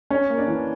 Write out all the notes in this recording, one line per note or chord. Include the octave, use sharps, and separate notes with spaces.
C#4 C#5
A#3
D4 D5
E3